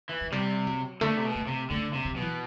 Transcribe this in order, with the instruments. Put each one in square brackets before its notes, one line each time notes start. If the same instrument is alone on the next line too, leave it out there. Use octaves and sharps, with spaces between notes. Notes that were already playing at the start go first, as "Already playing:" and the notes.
[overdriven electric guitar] E3
[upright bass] F#3
[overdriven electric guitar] C3 [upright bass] G3
[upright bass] F#3
[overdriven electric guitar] D3 [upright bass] A3
[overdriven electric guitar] C3
B2
[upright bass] A3
[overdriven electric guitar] C3
[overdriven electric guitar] D3 [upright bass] A3
[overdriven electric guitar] C3
[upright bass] F#3
[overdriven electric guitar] B2
[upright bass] E3